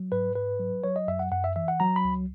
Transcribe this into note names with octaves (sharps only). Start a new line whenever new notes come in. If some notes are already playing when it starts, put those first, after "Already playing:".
Already playing: F#3
G#2 B4
G#2 B4
F#3
F#3 C#5
D#5
F#2 E5
F#5
F#2 F#5
E5
E3 E5
F#5
F#3 A#5
B5
C#2